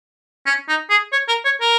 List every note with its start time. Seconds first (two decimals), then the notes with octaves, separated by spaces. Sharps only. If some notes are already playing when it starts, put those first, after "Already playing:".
0.46 C#4
0.68 D#4
0.90 G#4
1.13 C#5
1.28 A#4
1.45 C#5
1.61 A#4